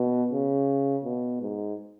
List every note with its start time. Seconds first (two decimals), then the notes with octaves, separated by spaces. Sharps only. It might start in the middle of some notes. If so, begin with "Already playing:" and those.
Already playing: B2
0.32 C#3
1.04 B2
1.41 G#2